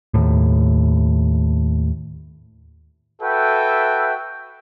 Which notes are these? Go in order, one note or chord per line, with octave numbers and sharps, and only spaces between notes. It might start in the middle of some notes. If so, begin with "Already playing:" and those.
D#2 A2
F#4 A4 B4 E5 G5